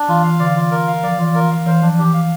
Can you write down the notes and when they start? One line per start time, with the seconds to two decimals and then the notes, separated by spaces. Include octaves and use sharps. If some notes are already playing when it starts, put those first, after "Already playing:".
Already playing: D4
0.08 E3 F4
0.24 E3 F5
0.34 E3
0.40 D3 D5
0.56 E3 F4
0.71 A#4
0.88 F5
1.03 F3 D5
1.19 E3 F4
1.35 E3 A#4
1.51 F5
1.66 E3 C5
1.82 F3 D4
1.98 E3 G4
2.14 F5